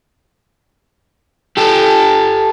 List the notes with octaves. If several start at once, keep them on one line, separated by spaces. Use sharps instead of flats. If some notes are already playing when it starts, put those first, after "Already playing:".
G4 A4